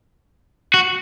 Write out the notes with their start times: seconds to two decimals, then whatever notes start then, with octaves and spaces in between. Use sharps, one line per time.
0.74 F#4